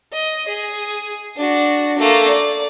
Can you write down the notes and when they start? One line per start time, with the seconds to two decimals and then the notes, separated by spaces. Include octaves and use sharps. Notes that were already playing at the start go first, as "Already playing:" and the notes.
0.12 D#5
0.48 G#4
1.37 D4 F#4
1.98 A3 A#3
2.28 D5